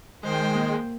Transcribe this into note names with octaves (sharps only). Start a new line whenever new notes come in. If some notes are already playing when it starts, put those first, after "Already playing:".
D#3 G#3 C5 G5
A#3